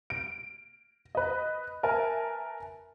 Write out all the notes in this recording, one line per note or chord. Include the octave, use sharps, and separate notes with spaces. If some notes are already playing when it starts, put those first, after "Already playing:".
D7
B4 D#5
A#4 B4 E5 G#5 A5